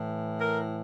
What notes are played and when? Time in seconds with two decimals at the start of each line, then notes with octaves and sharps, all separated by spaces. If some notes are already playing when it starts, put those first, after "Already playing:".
Already playing: A2 E3
0.41 A#4